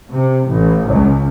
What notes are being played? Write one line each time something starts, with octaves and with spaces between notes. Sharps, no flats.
C3
A1
C#2